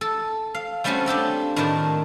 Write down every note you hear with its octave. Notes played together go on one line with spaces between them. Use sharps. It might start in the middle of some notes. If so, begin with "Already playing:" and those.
A4
F5
G3 A3 C4 C#4 F4 F#4
D4 G4 A4 D5
A2 D#3 D4 A#4 A5